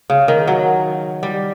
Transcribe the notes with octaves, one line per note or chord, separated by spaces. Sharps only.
C#3
D#3
F#3
G3